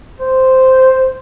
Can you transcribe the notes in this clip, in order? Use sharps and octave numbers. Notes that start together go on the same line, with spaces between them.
C5